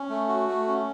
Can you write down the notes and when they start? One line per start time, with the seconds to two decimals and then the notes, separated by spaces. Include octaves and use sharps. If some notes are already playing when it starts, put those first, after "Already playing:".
Already playing: C#4
0.09 A3
0.29 F#4
0.49 A3
0.68 C#4